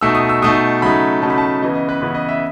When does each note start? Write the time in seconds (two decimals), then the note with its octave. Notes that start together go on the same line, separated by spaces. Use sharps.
0.01 B2 A3 D#4 E6
0.15 D#6
0.29 E6
0.42 B2 A3 D#4 D#6
0.82 C#3 F#3 A3 D#4 B5
1.22 C#3 F#3 A3 D#4 A5
1.30 B5
1.38 A5
1.62 C#3 E3 B3 D#5
1.75 D#5
1.89 B4
2.02 C#3 E3 B3 B4
2.15 D#5
2.29 E5